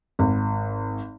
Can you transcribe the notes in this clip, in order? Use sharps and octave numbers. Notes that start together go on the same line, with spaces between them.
G#1